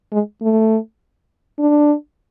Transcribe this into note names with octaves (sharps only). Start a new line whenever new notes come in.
G#3
A3
D4